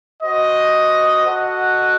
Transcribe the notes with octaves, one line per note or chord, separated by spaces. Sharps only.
F#4 C5 D#5
F#4 A4 D#5 F#5